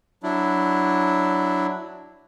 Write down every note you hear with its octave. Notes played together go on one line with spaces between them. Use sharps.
F#3 D4 E4